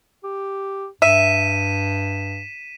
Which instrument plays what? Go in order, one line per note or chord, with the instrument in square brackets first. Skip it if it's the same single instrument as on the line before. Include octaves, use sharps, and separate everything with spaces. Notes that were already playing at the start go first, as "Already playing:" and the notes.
[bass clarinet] G4
[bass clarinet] G2 [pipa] E5 [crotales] B6 D#7 E7